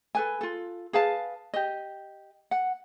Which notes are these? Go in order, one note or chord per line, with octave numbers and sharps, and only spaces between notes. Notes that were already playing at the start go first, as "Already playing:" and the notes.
A4 B4 G#5
F4 A4
G#4 B4 F5 A5
G4 D#5
F#5